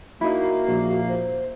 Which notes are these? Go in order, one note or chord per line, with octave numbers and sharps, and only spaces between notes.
A#3 D#4 E4 F#4
A#1
C5